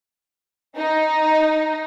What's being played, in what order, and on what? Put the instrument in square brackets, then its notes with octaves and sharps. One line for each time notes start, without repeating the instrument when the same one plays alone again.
[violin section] D#4